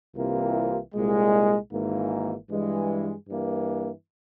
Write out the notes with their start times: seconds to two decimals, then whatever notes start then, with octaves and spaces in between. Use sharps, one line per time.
0.16 C2 C3 E3 A#3 F4
0.94 C2 A#2 G#3
1.72 G#1 G#2 E3 A#3
2.50 G2 E3 G#3
3.28 G2 E3 A#3